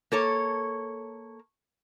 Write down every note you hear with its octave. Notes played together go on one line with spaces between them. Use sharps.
A#3 A4 C#5